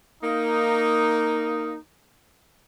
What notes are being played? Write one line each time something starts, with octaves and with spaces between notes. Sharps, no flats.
A#3 D#4